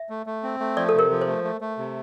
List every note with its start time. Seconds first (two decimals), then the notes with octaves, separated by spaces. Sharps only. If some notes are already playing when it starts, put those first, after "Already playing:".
Already playing: E5
0.10 A3
0.26 A3
0.43 C4
0.60 A3
0.77 F3 D5
0.89 A4
0.94 C3 A#4
1.10 F3
1.21 C5
1.27 A3
1.44 A3
1.61 A3
1.78 C3